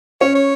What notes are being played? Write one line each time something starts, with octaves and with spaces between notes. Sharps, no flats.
C#4 C#5
C#5